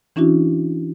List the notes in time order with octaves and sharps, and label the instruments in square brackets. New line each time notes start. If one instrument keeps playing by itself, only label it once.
[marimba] E3 C#4 D4 E4 F#4